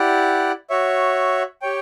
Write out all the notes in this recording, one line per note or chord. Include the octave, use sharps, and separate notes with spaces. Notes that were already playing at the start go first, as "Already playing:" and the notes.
Already playing: E4 G4 D5 F#5
F#4 C#5 E5
G4 C#5 G5